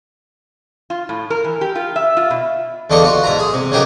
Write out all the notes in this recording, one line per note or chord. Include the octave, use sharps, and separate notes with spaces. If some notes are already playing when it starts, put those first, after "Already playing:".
F4
A2
A#4
E3
G4
F4
E5
F4
B2
E2 D3 D4 D#5 F5 C#6
F4 F#4
G#2 E4 A#5
G#4
C3
C#3 F#3 D#4 G4 A#4